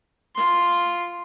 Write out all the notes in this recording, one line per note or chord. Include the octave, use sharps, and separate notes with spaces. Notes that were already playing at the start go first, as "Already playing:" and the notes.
F4 C6